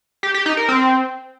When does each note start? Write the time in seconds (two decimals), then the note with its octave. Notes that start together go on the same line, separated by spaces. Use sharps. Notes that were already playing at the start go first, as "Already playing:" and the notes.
0.23 G4
0.34 G4
0.46 D#4
0.57 A#4
0.69 C4